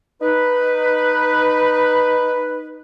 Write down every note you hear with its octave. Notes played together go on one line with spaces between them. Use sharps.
D#4 B4